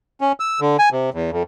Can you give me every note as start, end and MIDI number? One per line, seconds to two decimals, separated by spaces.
0.21 0.32 61
0.40 0.60 88
0.60 0.77 50
0.79 0.89 80
0.92 1.10 48
1.14 1.30 40
1.31 1.43 41